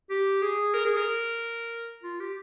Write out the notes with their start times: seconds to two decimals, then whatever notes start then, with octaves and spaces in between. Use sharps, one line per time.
0.10 G4
0.42 G#4
0.74 A#4
0.85 G#4
0.97 A#4
2.03 F4
2.20 G4